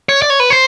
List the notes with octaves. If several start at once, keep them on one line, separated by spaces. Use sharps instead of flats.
C#5
D5
C#5
B4
C5